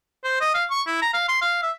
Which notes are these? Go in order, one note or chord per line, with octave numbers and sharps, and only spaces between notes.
C5
D#5
F5
C#6
E4
A#5
F5
C6
F5
E5